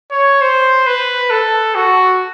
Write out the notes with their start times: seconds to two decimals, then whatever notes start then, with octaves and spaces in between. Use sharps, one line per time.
0.11 C#5
0.41 C5
0.86 B4
1.31 A4
1.75 F#4